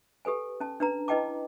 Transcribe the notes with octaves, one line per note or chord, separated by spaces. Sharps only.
G4 A4 B4 G#5
C#4 A5
D4 B4 A#5
E4 B4 D#5 G5 A5 D6